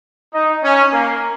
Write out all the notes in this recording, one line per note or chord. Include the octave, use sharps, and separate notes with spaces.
D#4
C#4
A#3